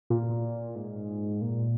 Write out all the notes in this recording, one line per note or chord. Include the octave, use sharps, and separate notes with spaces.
A#2
G#2
A#2